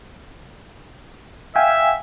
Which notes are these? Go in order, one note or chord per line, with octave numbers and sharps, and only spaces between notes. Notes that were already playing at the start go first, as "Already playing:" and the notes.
E5 F5 G5 G#5